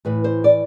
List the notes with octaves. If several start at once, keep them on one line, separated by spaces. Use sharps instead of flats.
A2 E3 B4
C5
D5